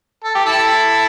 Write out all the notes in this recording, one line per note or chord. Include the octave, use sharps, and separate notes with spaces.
A4
G4
E4 A4